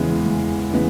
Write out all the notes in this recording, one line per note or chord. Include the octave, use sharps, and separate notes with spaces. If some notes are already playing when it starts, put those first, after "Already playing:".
Already playing: E2 C#3 E3 G#3 B3
E2
C#3 E3 G#3 B3